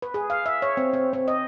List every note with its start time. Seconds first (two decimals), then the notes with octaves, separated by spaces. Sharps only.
0.02 B4
0.14 G#4
0.30 F5
0.46 E5
0.62 C#5
0.77 C4
0.94 C4
1.13 C4
1.28 D#5